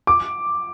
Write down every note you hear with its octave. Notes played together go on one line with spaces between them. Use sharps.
D6